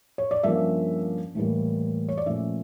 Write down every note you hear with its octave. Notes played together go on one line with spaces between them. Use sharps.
C#5
D5
G2 F3 A#3 C#4 E5
A2 E3 G3 A#3
C#5
D5
A#2 F3 A3 C#4 E5